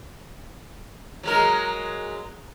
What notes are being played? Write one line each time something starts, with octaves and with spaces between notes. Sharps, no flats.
F#3 G#3 A#4